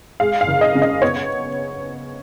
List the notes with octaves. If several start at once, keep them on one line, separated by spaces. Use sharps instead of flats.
G#3 F5
F5
F#1
D#5
C#3
D#5
B3 C#5